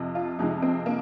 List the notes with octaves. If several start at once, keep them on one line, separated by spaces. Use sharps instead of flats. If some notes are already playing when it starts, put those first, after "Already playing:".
Already playing: F2 C3 F3
F4
F2 C3 F3 G#3 D#4
C4
A#3